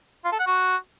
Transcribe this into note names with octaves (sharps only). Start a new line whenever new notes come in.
F4
A4
F#5
F#4